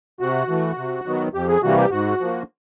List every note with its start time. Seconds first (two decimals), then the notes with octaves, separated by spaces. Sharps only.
0.20 C3 F#4
0.49 E3 A3
0.77 C3
1.06 D#3 F#3 B3
1.34 F2 G4
1.48 G#4
1.63 C3 E3 G3 A#3 F#4
1.77 G4
1.91 G#2 F#4
2.20 F3 A#3